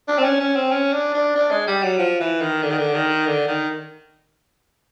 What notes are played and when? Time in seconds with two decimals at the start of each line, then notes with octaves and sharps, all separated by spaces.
0.08 D4
0.18 C4
0.24 C#4
0.40 C#4
0.56 C4
0.72 C#4
0.93 D4
1.14 D4
1.35 D4
1.51 G#3
1.67 G3
1.83 F#3
1.99 F3
2.20 E3
2.42 D#3
2.63 D3
2.71 D#3
2.79 D3
2.94 D#3
3.27 D3
3.48 D#3